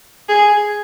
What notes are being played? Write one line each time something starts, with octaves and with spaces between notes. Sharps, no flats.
G#4